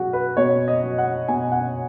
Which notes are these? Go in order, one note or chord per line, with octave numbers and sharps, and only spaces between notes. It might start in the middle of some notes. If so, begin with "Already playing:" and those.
Already playing: B2 F#3 F#4 G#4
B4
B2 C#5
D#5
F#3
F#5
B2 G#5
F#5